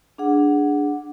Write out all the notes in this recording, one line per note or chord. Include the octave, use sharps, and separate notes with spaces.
D4 G#4 F#5